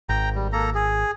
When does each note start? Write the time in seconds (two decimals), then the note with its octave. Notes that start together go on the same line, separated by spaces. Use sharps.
0.09 G#1 G5 A#5
0.35 G3
0.53 A#3 A4 A#5
0.75 G#4